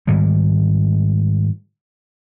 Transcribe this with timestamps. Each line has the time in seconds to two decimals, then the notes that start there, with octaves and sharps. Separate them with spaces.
0.07 G#2 D#3 G3 G#3